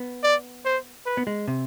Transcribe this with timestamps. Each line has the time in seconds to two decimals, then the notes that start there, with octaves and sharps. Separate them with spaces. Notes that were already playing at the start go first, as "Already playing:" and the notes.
Already playing: B3
0.23 D5
0.65 C5
1.06 B4
1.17 B3
1.27 G#3
1.48 C3